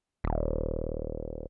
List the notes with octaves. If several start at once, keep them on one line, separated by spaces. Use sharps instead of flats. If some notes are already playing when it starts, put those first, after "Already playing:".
D#1